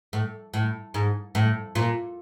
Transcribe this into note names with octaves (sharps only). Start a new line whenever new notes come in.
A2
A2
G#2
A2
A#2